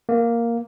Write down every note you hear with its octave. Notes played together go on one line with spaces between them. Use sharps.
A#3